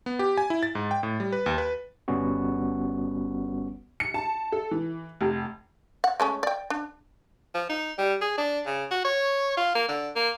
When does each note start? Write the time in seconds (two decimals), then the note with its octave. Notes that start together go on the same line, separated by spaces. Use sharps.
0.06 B3
0.19 G4
0.37 G#5
0.50 E4
0.63 A6
0.75 G#2
0.91 G5
1.03 A2
1.20 G3
1.32 B4
1.46 D#2
1.58 B4
2.08 G1 G3 B3 C#4 F#4
4.00 C#7
4.14 A5
4.52 A4
4.71 E3
5.21 F1
6.04 F#5
6.20 G#3 A3 C#4
6.43 D5 G5
6.70 D4
7.54 F3
7.69 D#4
7.98 G3
8.21 G#4
8.38 D4
8.66 C#3
8.91 F#4
9.05 C#5
9.57 F4
9.75 A#3
9.88 D3
10.15 A#3